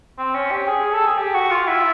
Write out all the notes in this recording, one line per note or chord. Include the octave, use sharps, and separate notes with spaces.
C4
C#4
G4
G#4
A4
G#4
G4
F#4
F4
E4